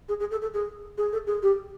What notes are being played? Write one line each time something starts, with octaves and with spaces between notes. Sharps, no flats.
G#4
G#4
A4
A4
G#4
G#4
A4
G#4
G4